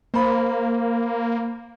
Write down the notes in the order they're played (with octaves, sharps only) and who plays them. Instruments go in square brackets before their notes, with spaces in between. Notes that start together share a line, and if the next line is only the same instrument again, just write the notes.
[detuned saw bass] A#3 [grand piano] C5 B5